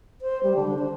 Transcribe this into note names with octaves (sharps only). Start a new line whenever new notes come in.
C5
G3
D3
D4
C5